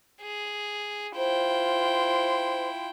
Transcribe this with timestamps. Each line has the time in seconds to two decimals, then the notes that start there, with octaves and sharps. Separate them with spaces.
0.21 G#4
1.17 E4 F4 C5 G5 C6